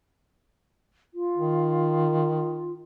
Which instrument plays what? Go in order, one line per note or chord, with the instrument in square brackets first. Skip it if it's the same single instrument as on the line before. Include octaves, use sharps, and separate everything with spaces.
[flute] F4
[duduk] D#3